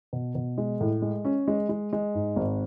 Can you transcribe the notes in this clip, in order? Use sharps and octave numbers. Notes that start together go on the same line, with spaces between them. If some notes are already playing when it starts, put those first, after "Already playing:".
B2
B2
G#3
A2
G#3
C#4
G#3
G#3
G#3
G#2
G#1